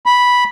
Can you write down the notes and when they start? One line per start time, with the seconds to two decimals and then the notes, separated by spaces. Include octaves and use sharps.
0.06 B5